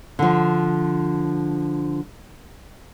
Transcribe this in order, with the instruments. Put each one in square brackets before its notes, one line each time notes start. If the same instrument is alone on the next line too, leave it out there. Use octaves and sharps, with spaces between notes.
[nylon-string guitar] D3 F3